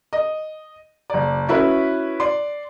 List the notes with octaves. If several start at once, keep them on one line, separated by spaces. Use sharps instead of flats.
D#5
F#1 D5
C#4 E4 F#4 B4
D5 C6